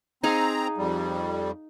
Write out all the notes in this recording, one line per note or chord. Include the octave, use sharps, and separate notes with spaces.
C4 D#4 G#4 F5 A#5
F2 G3